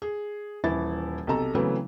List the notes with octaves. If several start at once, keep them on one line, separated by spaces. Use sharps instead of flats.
G#4
D#1 E3 E4 A6
B1 C3 A4 A#5
C#3 E3 F#3 A3 B3 C4